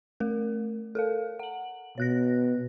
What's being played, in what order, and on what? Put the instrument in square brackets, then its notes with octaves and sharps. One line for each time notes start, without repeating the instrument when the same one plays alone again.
[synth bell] A3 A#4
A4 A#4 F5
F#5 F#7
[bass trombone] B2 [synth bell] C#5 F#6 A#6